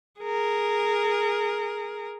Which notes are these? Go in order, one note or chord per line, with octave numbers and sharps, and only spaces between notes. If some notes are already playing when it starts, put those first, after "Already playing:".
G#4 A#4